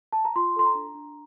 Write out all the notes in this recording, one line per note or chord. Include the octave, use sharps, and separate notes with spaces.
A5
A#5
F4 C6
A4 C6
A#5
D4
D4